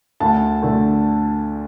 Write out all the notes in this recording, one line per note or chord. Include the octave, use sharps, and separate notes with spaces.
D2 A5
D3 A3